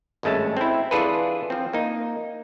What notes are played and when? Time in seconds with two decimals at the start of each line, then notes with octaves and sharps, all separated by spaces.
0.23 G#1 G2 G#3 A3 C#4 A5
0.57 C4 E4
0.91 E3 D4 F4 G#4 A4 B4
1.50 F3 C4
1.73 A#3 D#4